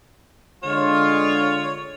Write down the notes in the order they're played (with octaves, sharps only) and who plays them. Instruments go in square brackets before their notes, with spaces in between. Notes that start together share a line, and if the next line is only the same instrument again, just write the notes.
[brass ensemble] D3 G#3 F4 [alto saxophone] C#5